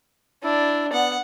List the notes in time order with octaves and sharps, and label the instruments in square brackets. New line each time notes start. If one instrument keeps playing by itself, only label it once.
[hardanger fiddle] D4 [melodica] E4
[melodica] B3 [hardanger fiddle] F#5